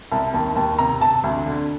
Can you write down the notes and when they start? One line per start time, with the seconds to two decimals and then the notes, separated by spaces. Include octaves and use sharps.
0.12 C2 A5
0.34 D#2 A5
0.56 D#2 A5
0.79 C3 A#5
1.01 C3 A5
1.24 D2
1.46 D3